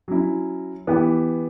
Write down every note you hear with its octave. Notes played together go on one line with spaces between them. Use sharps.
F#3 C#4 E4
E3 B3 E4 G4